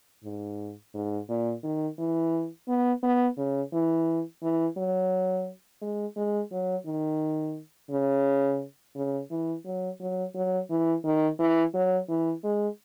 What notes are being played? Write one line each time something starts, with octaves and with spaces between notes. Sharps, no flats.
G#2
G#2
A#2
D#3
E3
B3
B3
C#3
E3
E3
F#3
G#3
G#3
F#3
D#3
C#3
C#3
E3
F#3
F#3
F#3
E3
D#3
E3
F#3
E3
G#3